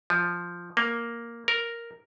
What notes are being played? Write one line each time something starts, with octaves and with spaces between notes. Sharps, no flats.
F3
A#3
A#4